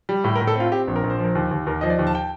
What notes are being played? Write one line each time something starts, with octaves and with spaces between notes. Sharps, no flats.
G3
A2 G4
A#4
A2
A4
C4 F4
C4 G4
A#1
A#4
A#1
C5
F3 A#4
D#2
D#2
D#2 A#4
F3 D#5
D5
D#2
A5
G5